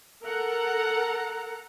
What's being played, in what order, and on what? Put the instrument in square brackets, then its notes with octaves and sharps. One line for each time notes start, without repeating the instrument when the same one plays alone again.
[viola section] A4 A#4 F#5 A#5